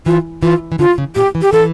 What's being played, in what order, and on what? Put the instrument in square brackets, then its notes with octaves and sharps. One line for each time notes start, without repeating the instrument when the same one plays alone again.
[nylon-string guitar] E3 [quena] F4
[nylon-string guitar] E3 [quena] F4
[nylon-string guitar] E3
[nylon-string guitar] D3 [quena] F4
[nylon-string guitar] C#3
[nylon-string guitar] A#2 [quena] G4
[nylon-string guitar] E3
[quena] G4
[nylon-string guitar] E3 [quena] A4